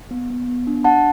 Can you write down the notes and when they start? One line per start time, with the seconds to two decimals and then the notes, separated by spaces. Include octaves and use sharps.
0.11 B3
0.30 B3
0.48 B3
0.67 D4
0.84 D4 F#5 A5